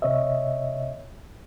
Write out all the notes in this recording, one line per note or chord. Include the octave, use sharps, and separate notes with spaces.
C3 C#5 D#5 E5